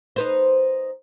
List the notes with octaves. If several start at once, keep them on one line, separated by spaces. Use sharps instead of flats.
D#4 B4 C5